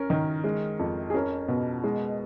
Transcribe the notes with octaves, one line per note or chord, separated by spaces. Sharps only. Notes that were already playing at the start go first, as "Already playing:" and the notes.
Already playing: C#4 A#4
D#3
G#3
F2
G#4
C#4 A#4
B2
G#3